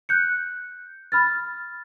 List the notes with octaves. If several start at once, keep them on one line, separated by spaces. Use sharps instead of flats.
F#6 G6 C#7
B5 F6 A6